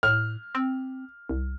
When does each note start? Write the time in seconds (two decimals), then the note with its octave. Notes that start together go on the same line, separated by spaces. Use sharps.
0.03 A2 F6
0.55 C4
1.29 C2